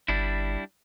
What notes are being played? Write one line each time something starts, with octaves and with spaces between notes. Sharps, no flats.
G1 G3 D4 E4